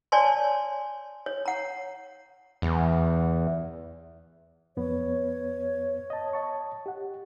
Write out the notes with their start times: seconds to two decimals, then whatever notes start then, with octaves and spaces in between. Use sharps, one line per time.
0.12 C#5 D5 G#5 A5 C6
1.26 C#5
1.46 F#5 A#5
2.62 E2
4.77 F2 B3 B4 C#5
6.10 D#5 A5
6.33 D#5 A5 C#6
6.86 G4 F#5